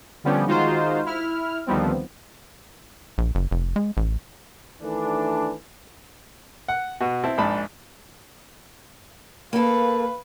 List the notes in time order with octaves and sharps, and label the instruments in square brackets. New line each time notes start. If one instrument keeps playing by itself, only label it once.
[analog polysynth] D3 F3 G3 B3 C#4 G4
D#3 G#3 D#4 F4 F#4 C5
E4 F6
D2 D#3 F3 G3 B3 C4
[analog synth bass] A#1
F#1
F1
G#3
A1
[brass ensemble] D#3 E3 A3 D4
[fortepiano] F#5
B2 F#4
C4 E4 A5
A#1 G#2 D4 A5 B5
[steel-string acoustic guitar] A#3 A4 [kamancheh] B4 F5